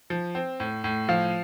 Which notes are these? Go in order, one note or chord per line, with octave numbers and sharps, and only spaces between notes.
F3
C4
A2
A2
F3 F5